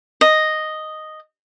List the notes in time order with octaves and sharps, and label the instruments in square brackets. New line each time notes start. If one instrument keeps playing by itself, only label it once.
[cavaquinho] D#5